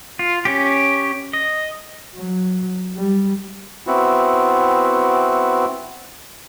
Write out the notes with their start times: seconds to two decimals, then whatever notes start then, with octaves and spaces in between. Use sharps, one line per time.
0.19 F4
0.45 C#4 G4
1.33 D#5
2.15 F#3
2.96 G3
3.87 B3 C4 E4 F#4